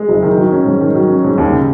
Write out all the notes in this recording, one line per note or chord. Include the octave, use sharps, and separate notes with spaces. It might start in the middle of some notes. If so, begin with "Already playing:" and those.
Already playing: G#3
F#1
D#3
F#3
C#4
G#2
D#3
F#3
C#4
G#2
D#2
C#3